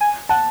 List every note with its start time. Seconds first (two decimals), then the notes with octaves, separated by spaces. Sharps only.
0.01 G#5
0.29 F#5 A5